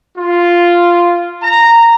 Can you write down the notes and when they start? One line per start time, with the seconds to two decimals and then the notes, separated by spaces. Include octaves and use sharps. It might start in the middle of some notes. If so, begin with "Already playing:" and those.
0.17 F4
1.43 A#5